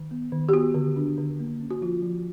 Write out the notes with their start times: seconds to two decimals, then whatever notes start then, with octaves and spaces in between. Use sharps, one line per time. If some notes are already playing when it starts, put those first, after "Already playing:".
Already playing: D#3
0.11 B3
0.32 D#3
0.49 G4
0.53 B3 F#4
0.74 D3
0.96 D4
1.18 D3
1.40 A#3
1.60 C#4
1.71 F#4
1.81 F3 F4
2.03 F3